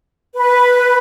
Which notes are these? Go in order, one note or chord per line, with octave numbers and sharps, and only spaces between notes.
B4